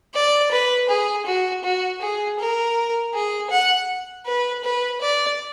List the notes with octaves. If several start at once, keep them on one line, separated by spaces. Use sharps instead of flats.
D5
B4
G#4
F#4
F#4
G#4
A#4
G#4
F#5
B4
B4
D5